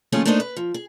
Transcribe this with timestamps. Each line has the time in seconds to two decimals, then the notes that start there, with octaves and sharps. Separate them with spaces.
0.12 D#2 F3 A3 C#4 F4 G#4
0.25 A3 A#3 D4 D#4 C5 D#5
0.40 B4
0.57 F3
0.74 G#4